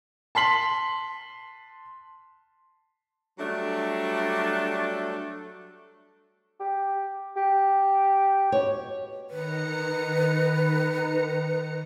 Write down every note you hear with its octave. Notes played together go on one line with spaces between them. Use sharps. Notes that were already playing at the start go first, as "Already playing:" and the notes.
A5 C6 B6 F#7
F#3 G3 A3 D4
G4
G4
B2 C#5
D#3 B4 A#5 C#7